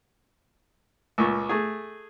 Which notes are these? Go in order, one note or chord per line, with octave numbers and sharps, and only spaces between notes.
C#2 A#2 C#6
A3 G#4